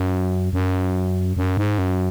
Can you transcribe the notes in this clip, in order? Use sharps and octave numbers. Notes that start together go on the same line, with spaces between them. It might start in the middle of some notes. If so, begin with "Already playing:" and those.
Already playing: F#2
F#2
F#2
G#2
F#2